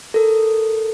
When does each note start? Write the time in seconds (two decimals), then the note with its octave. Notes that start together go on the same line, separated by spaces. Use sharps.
0.14 A4 A#4